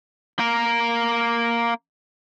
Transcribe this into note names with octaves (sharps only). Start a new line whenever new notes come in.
A#3 A#4